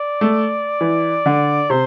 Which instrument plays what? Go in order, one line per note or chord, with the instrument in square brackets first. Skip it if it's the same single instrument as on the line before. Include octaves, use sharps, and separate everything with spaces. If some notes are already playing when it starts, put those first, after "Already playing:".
Already playing: [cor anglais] D5
[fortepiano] A3
E3
D3
[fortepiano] C3 [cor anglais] C5